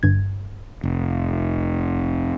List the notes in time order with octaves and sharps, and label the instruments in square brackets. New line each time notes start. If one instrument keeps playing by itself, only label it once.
[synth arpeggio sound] G1 G2 G#6
[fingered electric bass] F1